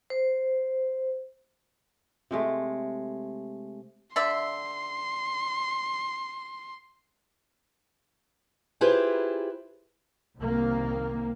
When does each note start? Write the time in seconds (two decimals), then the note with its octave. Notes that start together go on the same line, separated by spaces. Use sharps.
0.10 C5
2.31 C3 G#3 A3
4.16 D3 D5 E5 C6
8.81 E4 F4 G4 G#4 B4 C5
10.39 C2 C3 D#3 A#3